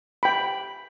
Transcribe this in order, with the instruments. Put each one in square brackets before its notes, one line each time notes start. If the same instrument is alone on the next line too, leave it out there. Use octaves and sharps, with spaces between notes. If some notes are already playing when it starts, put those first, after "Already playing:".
[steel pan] G5 B5